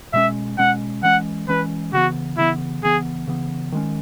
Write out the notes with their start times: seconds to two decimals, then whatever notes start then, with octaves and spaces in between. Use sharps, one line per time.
0.13 B2 G#3 C#4 E5
0.58 B2 G#3 C#4 F#5
1.03 E3 G#3 C#4 F#5
1.48 E3 G#3 C#4 B4
1.93 C#3 E3 B3 F#4
2.38 C#3 E3 B3 E4
2.82 C#3 E3 B3 G#4
3.27 C#3 E3 B3
3.72 D#3 G#3 C#4